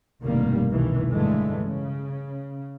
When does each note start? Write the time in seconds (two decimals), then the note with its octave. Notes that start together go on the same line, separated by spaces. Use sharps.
0.23 F1 G2 B2 D#3 G3 A#3
0.69 F1 C2 B2 D#3 E3
1.10 G2 D3 E3 G#3 A3
1.62 C#3